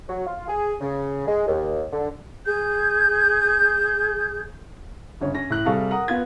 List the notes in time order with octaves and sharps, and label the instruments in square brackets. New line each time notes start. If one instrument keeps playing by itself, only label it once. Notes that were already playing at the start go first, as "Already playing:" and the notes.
[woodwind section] F#3
F4
G#4
C#3
G#3
D#2
D3
[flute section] G#4 G6
[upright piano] G1 C#3 C#5
C#4 A#6
A2 F#6 F#7
C3 G3 G#4 A4 F5 C#6
A#4 F#5 A#5 D#6
B3 F4 G#6